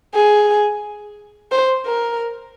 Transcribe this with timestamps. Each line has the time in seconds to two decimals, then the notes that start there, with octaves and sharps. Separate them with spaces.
0.15 G#4
1.52 C5
1.86 A#4